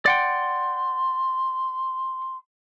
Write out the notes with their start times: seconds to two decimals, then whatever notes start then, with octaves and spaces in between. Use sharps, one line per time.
0.06 D5 F#5 G5 C6